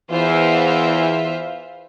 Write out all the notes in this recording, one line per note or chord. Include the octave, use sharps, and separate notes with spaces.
E2 E3 F4 C5 E5